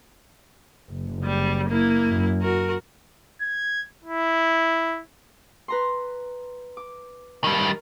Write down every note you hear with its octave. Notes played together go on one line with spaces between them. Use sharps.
F#1
G3
A#3 E4
F#2
F#4 A#4
G#6
E4
B4 A#5 C6
D6
D#3 G3 A#4